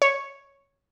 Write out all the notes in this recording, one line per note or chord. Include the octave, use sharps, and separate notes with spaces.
C#5